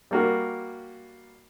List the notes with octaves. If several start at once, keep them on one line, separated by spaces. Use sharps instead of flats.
G3 A#3 F#4